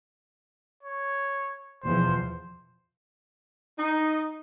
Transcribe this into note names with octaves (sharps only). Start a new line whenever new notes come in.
C#5
E2 B2 F3 C5
D#4